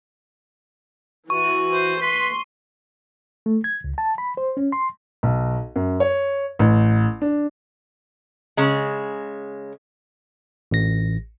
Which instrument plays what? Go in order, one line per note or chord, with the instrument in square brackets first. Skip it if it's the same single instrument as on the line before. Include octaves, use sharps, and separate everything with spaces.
[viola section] E3 F#4 [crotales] C#6
[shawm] C5
[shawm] B4 [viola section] C6
[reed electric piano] A3
G#6
C#2
A5
B5
C5
C#4
C6
[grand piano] B1
F#2
C#5
A1
D4
[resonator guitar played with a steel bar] C#3 G#3
[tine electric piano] A1 A#6